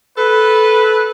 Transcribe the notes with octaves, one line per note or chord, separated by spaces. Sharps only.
A4 B4